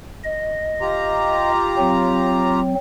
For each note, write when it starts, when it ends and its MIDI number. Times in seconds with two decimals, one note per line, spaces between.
0.24 1.50 75
0.81 2.60 65
0.81 2.60 67
0.81 2.60 82
1.78 2.74 54
1.78 2.74 60